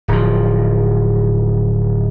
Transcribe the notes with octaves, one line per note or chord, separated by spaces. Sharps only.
D1 F3